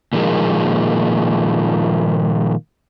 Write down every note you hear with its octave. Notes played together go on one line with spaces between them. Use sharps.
A#2 D#3 F3 F#3 G#3 A#3